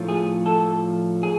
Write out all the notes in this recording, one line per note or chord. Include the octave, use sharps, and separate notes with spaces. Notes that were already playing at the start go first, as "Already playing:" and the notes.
Already playing: A2 F3
G#4
A4
G#4